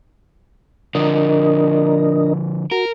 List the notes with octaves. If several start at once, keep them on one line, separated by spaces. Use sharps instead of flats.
D3 F3 D4 A#4 D#5
F#4 A#4